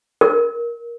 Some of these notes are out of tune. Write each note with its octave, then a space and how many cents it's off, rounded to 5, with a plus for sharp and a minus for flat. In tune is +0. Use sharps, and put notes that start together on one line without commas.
A#4 +15